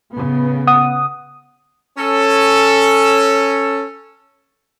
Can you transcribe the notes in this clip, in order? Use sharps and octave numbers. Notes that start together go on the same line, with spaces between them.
A2 C#3 B3
F#5 D#6
C#4 A4